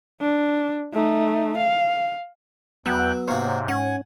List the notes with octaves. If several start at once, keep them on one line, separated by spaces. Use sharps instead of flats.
D4
A3 D#4
F5
E2 F#3 B3 G5 E6 F#6
G#2 C3 A#3 F#4 C5 C#5 F5
G#2 C#4 F#5 G#5